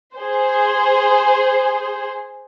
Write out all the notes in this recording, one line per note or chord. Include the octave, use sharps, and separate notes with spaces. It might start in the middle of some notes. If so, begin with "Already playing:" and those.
G#4 C5